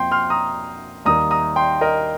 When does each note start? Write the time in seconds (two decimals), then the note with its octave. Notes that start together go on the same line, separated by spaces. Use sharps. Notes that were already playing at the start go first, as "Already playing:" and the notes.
Already playing: F2 F3 A#3 G5 C6
0.11 C6 F6
0.30 A#5 D#6
1.05 D#2 D#3 G3 A#3 A#5 D#6
1.31 A#5 D#6
1.56 G5 C6
1.81 A#4 D#5